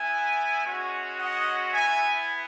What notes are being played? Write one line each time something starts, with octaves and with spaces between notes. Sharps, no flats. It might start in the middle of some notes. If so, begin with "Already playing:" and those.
Already playing: B3 E4 E5 G#5
G#3 C#4 F#4
D#5 F#5
B3 E4 E5 G#5